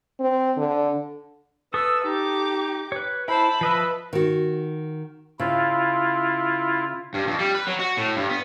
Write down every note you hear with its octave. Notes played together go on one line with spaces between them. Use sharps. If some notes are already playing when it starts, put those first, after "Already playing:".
C4
D3
A4 B4 C#6 D#6 E6
D#4 G4 D6
B4 C#5
E4 C5 A5 B5
F3 B4 D#5 E5
D#3 F#4
C#3 E4 F4
G2
F2
G3
B4
F#3
F#4
A2
G2
B3